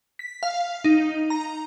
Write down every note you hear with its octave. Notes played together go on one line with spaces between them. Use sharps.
B6
F5
D#4
A#5